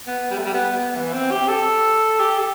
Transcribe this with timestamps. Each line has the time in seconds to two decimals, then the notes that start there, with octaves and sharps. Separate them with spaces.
0.07 B3
0.31 G3
0.38 A3
0.45 G3
0.54 B3
0.78 B3
0.96 E3
1.13 C4
1.31 G4
1.49 A4
2.20 G4
2.39 A4